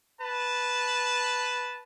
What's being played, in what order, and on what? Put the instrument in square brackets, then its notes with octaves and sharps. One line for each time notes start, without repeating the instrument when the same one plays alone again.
[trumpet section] B4 A5